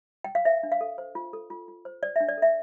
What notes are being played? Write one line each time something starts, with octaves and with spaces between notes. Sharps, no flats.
G5
F5
C5 E5
D4
F5
A4
C5
F4
A4
F4
F4
C5
C5 D5
E5
D4
D5
A4 E5